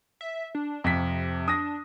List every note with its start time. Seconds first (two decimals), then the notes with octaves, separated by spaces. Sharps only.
0.21 E5
0.55 D4
0.84 F2 C3 B6
1.48 D4 D#6 A#6